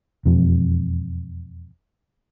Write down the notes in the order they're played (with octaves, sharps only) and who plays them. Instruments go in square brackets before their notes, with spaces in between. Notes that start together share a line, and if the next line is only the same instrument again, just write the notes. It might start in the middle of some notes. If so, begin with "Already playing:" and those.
[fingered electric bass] E1 F2